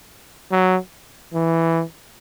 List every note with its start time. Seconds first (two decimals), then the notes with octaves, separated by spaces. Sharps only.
0.52 F#3
1.34 E3